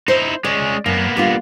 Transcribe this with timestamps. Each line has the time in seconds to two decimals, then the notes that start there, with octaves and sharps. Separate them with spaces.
0.08 D#4 E4 C5
0.44 G#3 C#4 D5
0.86 F#2 A#3 B3
1.17 G3 D4 F4